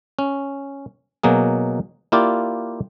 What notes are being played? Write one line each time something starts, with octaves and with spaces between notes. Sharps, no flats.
C#4
B2 F#3 A#3 G#4
A#3 E4 F4 G4 D5